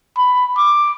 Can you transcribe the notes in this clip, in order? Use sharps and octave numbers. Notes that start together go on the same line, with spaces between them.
B5
D6